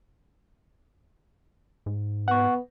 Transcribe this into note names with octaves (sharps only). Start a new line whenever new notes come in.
G#2
B3 F#5 C#6